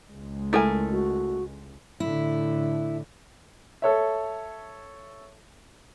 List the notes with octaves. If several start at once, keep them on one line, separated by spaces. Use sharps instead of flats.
C#2 G#3
A3 E4 A4 A#4 G#5
F#4
A2 D3 E4
A4 C#5 E5